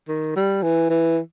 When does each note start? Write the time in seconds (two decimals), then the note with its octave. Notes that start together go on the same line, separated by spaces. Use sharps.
0.09 D#3
0.36 G3
0.63 E3
0.90 E3